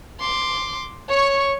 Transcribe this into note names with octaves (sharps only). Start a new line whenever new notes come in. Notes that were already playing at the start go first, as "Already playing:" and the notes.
C6 D6
C#5 C#6